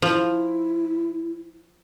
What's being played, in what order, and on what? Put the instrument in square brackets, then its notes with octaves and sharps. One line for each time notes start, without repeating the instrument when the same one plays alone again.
[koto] F3 [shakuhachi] E4